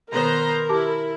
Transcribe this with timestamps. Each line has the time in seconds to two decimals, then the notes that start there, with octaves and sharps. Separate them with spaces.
0.12 B2 D#3 B3 A#4 C5 A#5
0.69 E4 G4 A5 D6